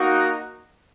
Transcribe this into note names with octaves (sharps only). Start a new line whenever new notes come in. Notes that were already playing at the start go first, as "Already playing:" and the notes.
Already playing: A#3 D#4 F#4